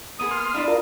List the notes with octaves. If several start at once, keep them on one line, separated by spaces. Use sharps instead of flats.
A#3 B3 G#4 D#6
C6 F6
D4 E4 D5
F4 A#4